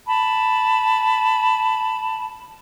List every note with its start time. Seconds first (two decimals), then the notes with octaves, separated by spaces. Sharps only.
0.06 A5 B5